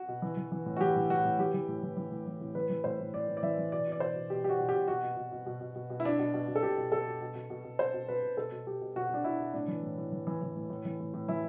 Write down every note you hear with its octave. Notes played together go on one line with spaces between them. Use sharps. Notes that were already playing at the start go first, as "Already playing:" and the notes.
Already playing: F#4
B2
E3
E3
E3
A2
F#4
E3 G4
A2
A2 F#4
A2
E3 G4
E3
A2
E3
E3
A2
E3
A2
E3 B4
E3
A2 C5
A2
A2 D5
A2
D5
E3 E5
E3
B2 D5
B2
D5
B2 C5
B2
B2 G4
B2 G4
F#4
B2
G4
B2
B2 F#4
B2
B2
B2
B2
B2
B2
B2
E4
B2 D4
B2
B2
B2
A4
B2 G4
B2
B2 A4
B2
B2
B2
B2
B2
B2 C5
B2
B2 B4
B2
B2 A4
B2
B2 G4
B2
B2 F#4
B2 D4
B2 E4
B2
A2 D4
E3
A2
A2
E3
E3
E3
A2
A2
E3
A2
A2
E3 E4